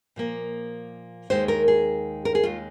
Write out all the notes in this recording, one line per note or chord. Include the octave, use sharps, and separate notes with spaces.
A#2 F3 A#3
D#2 D#3 G#3 C5
A#4
G#4
A#4
G#4
D#2 D#3 G#3 F4